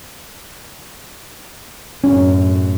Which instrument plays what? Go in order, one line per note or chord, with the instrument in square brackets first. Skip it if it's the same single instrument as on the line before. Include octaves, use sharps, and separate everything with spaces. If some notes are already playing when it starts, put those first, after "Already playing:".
[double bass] F#2 A2 [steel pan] C#4